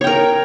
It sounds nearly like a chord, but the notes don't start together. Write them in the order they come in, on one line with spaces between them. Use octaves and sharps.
C#5 G5 A#4